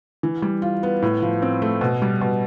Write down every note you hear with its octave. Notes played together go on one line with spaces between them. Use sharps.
E3
G3
F4
B3
A2
F3
C4
A3
B2
G3
B2